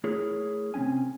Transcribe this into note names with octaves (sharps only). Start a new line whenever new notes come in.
A3 E4 G#4 A#4 C#5
C3 F#3 C4 C#4 G#5